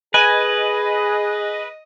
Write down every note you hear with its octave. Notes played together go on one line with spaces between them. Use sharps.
G#4 B4 D#5 G#5